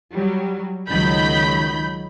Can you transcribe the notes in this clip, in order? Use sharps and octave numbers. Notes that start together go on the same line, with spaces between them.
F#3 G3
C#2 D#3 F#3 B5 G6